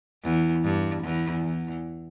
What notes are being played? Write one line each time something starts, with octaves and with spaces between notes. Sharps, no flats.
E2
G2
E2
E2